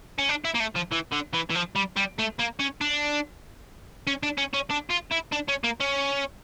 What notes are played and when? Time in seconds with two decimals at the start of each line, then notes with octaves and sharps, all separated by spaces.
0.19 C#4
0.29 D4
0.45 E4
0.55 A#3
0.60 A3
0.76 F3
0.92 E3
1.13 D3
1.34 E3
1.51 E3
1.55 F3
1.76 G3
1.96 G3
2.19 A3
2.39 A#3
2.59 C#4
2.81 D4
4.07 C#4
4.23 D4
4.38 C#4
4.54 C#4
4.71 D4
4.90 F4
5.12 E4
5.33 D4
5.49 C#4
5.64 A#3
5.81 C#4